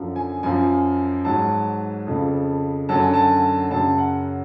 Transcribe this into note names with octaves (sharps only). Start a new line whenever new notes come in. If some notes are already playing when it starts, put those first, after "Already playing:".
Already playing: F#2 D3 F3
G#5
F#2 F3 G#5
G#2 F#3 A5
F2 C#3 F3
F#2 D3 F#3 A5
G#5
A5
F#2 C#3 F#3 A5
F#5